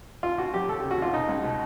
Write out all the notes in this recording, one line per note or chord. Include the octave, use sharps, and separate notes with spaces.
D#2 F4
D#2 F#4
F#3 G4
D#2 A4
C#3 G4
F#4
D#2 F4
B2 D#4
C#2
B2